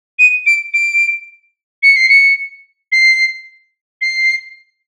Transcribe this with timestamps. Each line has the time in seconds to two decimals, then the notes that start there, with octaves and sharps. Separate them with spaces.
0.19 D#7
0.46 D7
0.74 D7
1.83 C#7
1.96 C7
2.09 C#7
2.92 C7
4.01 C7